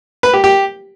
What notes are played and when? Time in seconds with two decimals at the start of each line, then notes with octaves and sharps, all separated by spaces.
0.23 B4
0.33 G4
0.44 G4